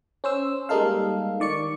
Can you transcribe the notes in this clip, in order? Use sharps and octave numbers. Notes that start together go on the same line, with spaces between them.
C#4 C5 E6
G3 G#3 A#3 D#4 A4 F5
D#3 D5 C#6 C#7